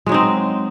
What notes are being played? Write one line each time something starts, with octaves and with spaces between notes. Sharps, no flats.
F#3 G#3 C4 D#4